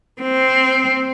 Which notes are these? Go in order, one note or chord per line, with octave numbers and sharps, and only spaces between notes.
C4